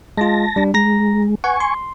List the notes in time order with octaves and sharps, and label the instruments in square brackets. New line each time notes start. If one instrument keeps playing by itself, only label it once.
[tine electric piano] G#3 F4 [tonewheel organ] A5 A#6
[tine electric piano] G3 D4
[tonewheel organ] G#3 [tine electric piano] A#5 A#6
[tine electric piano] B4 F#5 [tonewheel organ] G#5 C#6
[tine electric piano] C6